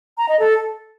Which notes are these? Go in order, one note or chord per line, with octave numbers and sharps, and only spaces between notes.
A#5
D#5
A4